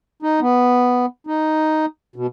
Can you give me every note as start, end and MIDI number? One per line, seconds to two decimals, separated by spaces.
0.22 0.40 63
0.41 1.06 59
1.27 1.86 63
2.16 2.27 47